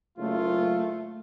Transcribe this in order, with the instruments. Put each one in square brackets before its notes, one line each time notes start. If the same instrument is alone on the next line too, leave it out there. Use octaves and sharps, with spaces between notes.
[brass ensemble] F#1 F4 [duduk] A3